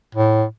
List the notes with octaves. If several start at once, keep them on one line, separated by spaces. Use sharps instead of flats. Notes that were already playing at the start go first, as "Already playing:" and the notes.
A2